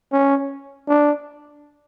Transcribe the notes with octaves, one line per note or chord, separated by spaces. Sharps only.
C#4
D4